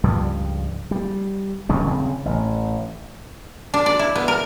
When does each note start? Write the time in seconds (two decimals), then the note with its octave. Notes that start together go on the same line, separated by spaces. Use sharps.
0.04 C#2 G2 F3 G3
0.91 G3
1.69 D#2 C#3 G3 C#4
1.87 D#1 C#3 C4
2.25 A1
3.74 D4
3.86 D5
3.99 E4
4.15 B3
4.28 A#4